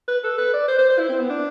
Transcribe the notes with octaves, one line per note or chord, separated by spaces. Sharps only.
B4
A4
B4
D5
C5
C5
C5
E4
C4
B3
D4